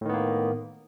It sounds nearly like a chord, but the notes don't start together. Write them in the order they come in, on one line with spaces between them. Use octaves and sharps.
A2 D#3 B3 A#3